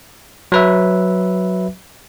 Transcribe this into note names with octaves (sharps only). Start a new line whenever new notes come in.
F#3 B4 E5